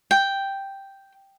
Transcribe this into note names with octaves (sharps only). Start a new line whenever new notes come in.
G5